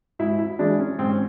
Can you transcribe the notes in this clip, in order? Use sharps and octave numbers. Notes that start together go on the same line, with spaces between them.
G#2 E4
E4
E3 G#3 D4
C#4
G#2 C4
C#4